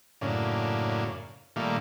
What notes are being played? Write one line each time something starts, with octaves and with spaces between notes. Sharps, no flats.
F#2 A2 C#3 A#3 D4
A#2 D#3 G3 A3 A#3